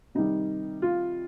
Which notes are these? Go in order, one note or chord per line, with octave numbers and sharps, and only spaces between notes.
C3 D#3 G3 D#4
F4